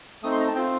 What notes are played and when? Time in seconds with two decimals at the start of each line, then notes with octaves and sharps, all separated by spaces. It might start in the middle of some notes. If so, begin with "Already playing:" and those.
0.22 A3 C4 D#4 D#6
0.32 C6
0.40 A#5
0.48 A5
0.55 C4 F4 G5